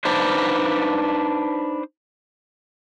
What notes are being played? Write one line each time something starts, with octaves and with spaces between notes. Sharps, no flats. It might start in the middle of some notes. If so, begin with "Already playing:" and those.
D4 D#4 B4 C5 D5